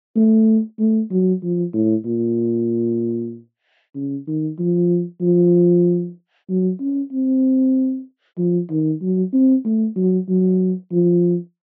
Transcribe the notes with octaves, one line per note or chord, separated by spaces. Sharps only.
A3
A3
F#3
F3
A2
A#2
C#3
D#3
F3
F3
F#3
C#4
C4
F3
D#3
F#3
C4
A3
F#3
F#3
F3